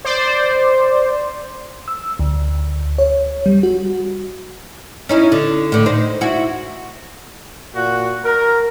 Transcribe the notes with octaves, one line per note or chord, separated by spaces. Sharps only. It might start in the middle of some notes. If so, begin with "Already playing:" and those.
C5 D5
E6
D2
C#5
G3
F#4
C#4 D#4 E4
D3
A2 D3
D#4 C5
E4 F#4
A#2 F#4
A#4